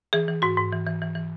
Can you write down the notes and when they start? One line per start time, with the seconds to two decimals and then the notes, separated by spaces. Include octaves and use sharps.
0.13 E3 G#4
0.28 E3
0.42 G#2 F#4
0.57 G#2
0.72 E3
0.87 E3
1.02 E3
1.15 E3